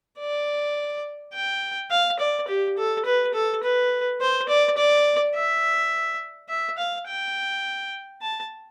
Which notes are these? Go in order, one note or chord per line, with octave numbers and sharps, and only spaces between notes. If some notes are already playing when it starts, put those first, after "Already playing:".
D5
G5
F5
D5
G4
A4
B4
A4
B4
C5
D5
D5
E5
E5
F5
G5
A5